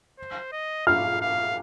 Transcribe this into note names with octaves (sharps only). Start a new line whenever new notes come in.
C5
D#5
F5 F6
F5